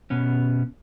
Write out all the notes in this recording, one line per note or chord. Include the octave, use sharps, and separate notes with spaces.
B2 B3 C#4